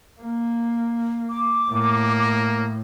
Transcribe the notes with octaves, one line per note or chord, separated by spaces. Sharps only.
A#3
D6
A2 A#3